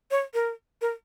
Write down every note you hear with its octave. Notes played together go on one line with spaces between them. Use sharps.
C#5
A#4
A#4